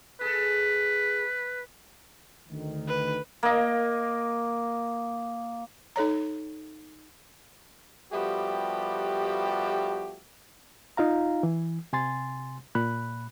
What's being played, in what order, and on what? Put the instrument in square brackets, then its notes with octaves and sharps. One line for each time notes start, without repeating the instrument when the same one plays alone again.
[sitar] G#4 A4 [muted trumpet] B4
[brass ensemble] D2 D#3
[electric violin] B4
[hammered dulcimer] A#3 D#5
[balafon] D#4 A4 C#5 A#5
[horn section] F3 G3 A3 B3 F#4 G4
[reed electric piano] D#4 F4 F5 A#5
E3
C3 G#5 C6 A6
A#2 B5 F#6